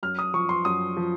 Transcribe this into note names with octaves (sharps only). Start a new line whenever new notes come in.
F#2 F6
D#6
F3 C#6
C6
F#2 D#6
F3